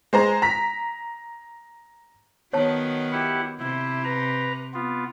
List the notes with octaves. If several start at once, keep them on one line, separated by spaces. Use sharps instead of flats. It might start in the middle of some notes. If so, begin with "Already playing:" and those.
G#3 C5 A#5
A#5 B6
D#3 F#3 B3 C#5 A5
E4 G4 F#5
C3 E4
B4 A#5
B3 F4